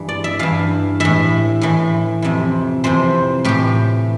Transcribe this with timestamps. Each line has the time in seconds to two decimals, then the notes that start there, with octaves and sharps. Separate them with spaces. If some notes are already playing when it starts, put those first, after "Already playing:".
Already playing: G2 E3
0.09 D5
0.24 E5
0.39 G2 E3 F5
1.00 A2 E3 E5
1.61 A2 E3
2.22 F2 C3 E3
2.84 F2 C3 E3 C5
3.45 A2 E3 G4